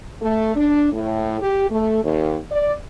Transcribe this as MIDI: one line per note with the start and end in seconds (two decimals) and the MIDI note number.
0.22 0.52 57
0.56 0.88 62
0.92 1.39 45
1.41 1.69 67
1.70 2.03 57
2.04 2.37 39
2.51 2.73 74